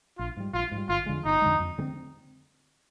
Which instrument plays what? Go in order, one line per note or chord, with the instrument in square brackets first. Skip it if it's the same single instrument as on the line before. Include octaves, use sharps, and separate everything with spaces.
[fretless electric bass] A#1 [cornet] F4
[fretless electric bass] G#2 G3
[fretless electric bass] A#1 [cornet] F4
[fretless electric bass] G#2
G3
[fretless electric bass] G1 [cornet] F4
[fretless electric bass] F2 D3 G#3
[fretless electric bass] G1 [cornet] D#4
[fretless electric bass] F2 D3 G#3
F2
D3 G#3
C4